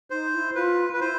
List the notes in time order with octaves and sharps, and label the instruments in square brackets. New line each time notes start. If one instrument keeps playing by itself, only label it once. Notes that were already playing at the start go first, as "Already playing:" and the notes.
[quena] D#4 [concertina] C5
[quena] E4
[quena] F4 [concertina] B4
[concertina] B4
[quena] E4 [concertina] C5